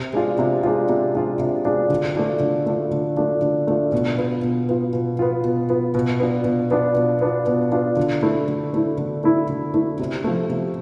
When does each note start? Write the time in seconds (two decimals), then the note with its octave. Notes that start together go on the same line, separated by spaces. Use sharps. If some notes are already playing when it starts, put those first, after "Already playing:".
Already playing: C3
0.13 G#3 D4 F4
0.39 C3
0.63 G#3 D4 F4
0.89 C3
1.14 G#3 D4 F4
1.39 C3
1.65 G#3 D4 F4
1.90 D3
2.15 A3 D4 F4
2.40 D3
2.66 A3 D4 F4
2.91 D3
3.17 A3 D4 F4
3.42 D3
3.67 A3 D4 F4
3.92 B2
4.18 B3 F4
4.43 B2
4.68 B3 F4
4.93 B2
5.19 B3 F4
5.44 B2
5.69 B3 F4
5.94 B2
6.20 B3 D4 F4
6.45 B2
6.71 B3 D4 F4
6.95 B2
7.21 B3 D4 F4
7.47 B2
7.71 B3 D4 F4
7.96 D3
8.22 A3 E4
8.48 D3
8.73 A3 E4
8.98 D3
9.24 A3 E4
9.49 D3
9.74 A3 E4
9.99 C3
10.24 F3 A3
10.50 C3